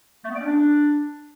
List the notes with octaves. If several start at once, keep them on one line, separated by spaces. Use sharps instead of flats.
A3
B3
D5
C#4
D4